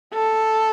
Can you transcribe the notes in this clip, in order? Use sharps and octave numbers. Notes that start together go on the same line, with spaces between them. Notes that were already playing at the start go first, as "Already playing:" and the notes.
A4